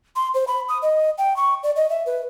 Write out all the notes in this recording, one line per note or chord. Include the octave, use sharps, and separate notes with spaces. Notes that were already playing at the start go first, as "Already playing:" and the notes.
C6
C5
B5
D#6
D#5
G5
C#6
D5
D#5
E5
B4